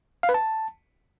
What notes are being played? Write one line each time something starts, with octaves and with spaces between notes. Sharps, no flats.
F5
B4
A5